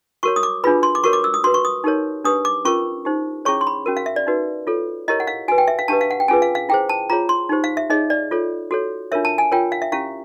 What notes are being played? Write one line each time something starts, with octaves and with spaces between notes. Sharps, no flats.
F#4 A#4 C#5 C#6
D#6
D6
D4 F4 G#4 B4 B5
C6
D6
F#4 A#4 C#5 C#6
D6
E6
D#6
F#4 B4 C6
C#6
D#6
D#4 G4 A#4 C#5
D4 G4 B4 D#6
D6
C#4 F4 A#4 C#6
D#4 G4 C5
C#4 E4 G#4 C#5 C#6
C6
B5
C#4 F#4 A#4
F5
E5
D5
D#4 F#4 B4
F4 A4 C#5
E4 G4 A#4 C#5 D#5
F#5
F5
F#4 B4 G#5
G5
E5
F5
D4 G4 B4 A5
F5
F#5
G5
C#4 F4 G#4 B4 G#5
F5
F5
E4 G#4 C5 G5
A5
F4 G#4 C#5 A#5
C6
D#4 G4 C5
F5
E5
D#4 G#4 C#5 D#5
D5
F4 A4 C#5
F#4 A4 C#5
D4 F4 A#4 C#5 E5
A5
G#5
F4 A#4 C#5 G5
F5
E5
C#4 E4 G4 F5